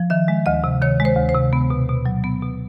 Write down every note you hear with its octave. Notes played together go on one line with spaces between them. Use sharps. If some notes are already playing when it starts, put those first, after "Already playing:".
Already playing: F3
D#3 E5
G#3
D2 D#5
C3
D#3 C#5
G#3
C5
D2
C5
C3
B3
B2
B2
F#3
B3
B2